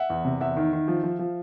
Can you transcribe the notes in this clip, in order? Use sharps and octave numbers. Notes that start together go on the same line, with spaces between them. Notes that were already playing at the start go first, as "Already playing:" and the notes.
Already playing: E5 F#5
E2
C3
E2 E5 F#5
D#3
D#3
F3
F3
F3